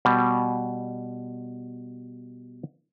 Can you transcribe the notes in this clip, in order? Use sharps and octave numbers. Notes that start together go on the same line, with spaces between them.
B2 G3